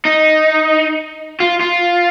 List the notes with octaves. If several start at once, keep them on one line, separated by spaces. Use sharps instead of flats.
D#4
F4
F4